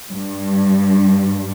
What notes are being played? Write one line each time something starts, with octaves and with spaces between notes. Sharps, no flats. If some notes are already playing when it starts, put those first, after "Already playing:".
G2